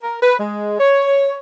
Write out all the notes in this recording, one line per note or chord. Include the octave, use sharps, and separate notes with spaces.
A#4
B4
G#3
C#5